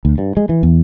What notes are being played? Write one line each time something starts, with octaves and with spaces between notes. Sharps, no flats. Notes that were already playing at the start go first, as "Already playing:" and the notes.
D2
G2
G#3
E3
E2